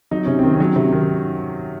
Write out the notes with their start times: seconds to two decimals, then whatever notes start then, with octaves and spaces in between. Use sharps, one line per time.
0.11 F#3 D#4
0.25 C3 C#4
0.39 D#3 C4
0.54 C#4
0.60 F#3
0.76 C3
0.92 D#3